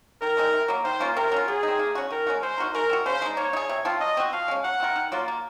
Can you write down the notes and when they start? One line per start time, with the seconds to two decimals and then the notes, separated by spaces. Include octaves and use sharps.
0.21 D#3 A#4
0.37 G#3 C4 D#4
0.53 C3
0.68 F#3 A#3
0.84 D#3 C5
1.00 A#3 C#4 F4
1.16 C3 A#4
1.32 F#3 C#4 F4
1.48 F#3 G#4
1.63 D#4
1.68 C4
1.79 A#3
1.95 C#4 F#4
2.11 D#3 A#4
2.27 G#3 C#4 F#4
2.42 G#3 C5
2.58 D#4 F#4 A#4
2.74 G#3 A#4
2.90 C4 F#4
3.06 C#3 C5
3.22 G#3 D#4
3.37 A#3 C#5
3.53 D#4
3.57 G#4
3.69 C3
3.85 F3 C4 F4
4.00 F#3 D#5
4.17 C4 F#4
4.32 F3 F5
4.48 G#3 C#4
4.64 F#3 F#5
4.80 C4 F4 A#4
4.96 D#3
5.12 F#3 A#3 F4
5.28 A#3